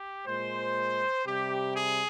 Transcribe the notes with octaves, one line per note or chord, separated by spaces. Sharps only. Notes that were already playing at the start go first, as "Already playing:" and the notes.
Already playing: G4
A#2 G#3 C5
C3 G3 G4
G#4